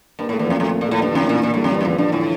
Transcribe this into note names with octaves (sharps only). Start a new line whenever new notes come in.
G2 A#3
A2 A3
E2
F2 F3
F2 A3
A#3
A#2
A2 A3
G2 D3
F2 E3
A#3
A#2
A#2 E3
A2 G3
F2
G2 G3
F2
E2 F3
G2 D3
A2 E3